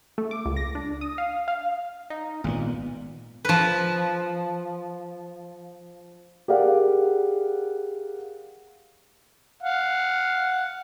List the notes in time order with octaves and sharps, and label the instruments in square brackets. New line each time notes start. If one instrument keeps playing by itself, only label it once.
[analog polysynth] A3
D6
C#2
A#6
D4
D#6
F5
F5
[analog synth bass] D#4
[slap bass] G#1 C#3 B3 [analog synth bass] A#2
[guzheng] F3 B4
[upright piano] G4 G#4 A#4 D5 F5 F#5
[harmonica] F5 F#5